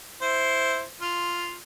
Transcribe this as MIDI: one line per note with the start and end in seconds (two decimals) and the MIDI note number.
0.22 0.82 64
0.22 0.82 72
1.01 1.56 65